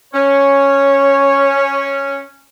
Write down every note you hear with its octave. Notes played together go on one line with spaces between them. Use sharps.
C#4 C#5